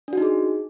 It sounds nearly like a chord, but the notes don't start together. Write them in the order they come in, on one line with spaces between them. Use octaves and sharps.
D4 F#4 D#4 G#4